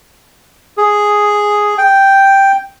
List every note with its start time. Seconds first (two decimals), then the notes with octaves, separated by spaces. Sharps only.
0.77 G#4
1.78 G5